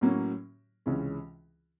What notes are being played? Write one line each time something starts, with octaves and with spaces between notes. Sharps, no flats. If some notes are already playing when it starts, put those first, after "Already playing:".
A2 F#3 A#3 C#4
C#2 C3 E3 G#3 C#4